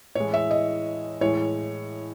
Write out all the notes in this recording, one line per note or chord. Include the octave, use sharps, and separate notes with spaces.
A2 E3 G#3 C#5
E5
D#5
A2 E3 G#3 C#5